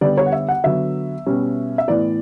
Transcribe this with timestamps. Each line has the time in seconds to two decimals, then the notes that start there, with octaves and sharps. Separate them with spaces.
0.01 D3 G3 B3 D5
0.18 C#5
0.26 F#5
0.32 E5
0.49 F#5
0.64 D3 F#3 B3 E5
1.26 B2 G3 C#4
1.78 E5
1.88 A2 E3 B3 D5